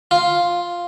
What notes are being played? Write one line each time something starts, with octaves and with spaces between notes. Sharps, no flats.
F4